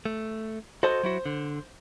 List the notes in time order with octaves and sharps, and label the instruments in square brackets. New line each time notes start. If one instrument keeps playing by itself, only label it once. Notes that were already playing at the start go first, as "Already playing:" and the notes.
[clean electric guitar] A3
[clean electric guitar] F#4 A4 D#5 [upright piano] C5
[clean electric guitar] F#3 E4 F#4
D3